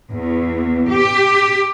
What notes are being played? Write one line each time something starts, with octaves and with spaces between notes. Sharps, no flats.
E2
G4